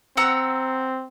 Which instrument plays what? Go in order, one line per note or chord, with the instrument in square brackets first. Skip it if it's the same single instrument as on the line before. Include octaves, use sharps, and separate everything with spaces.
[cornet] C4 [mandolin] F#5 A#5 E6